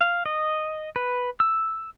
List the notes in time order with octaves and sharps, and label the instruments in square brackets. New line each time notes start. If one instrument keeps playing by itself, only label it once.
[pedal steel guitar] F5
D#5
B4
E6